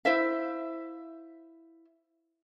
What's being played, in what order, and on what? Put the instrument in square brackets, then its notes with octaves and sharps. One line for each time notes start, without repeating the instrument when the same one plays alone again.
[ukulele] E4 C5 E5 F5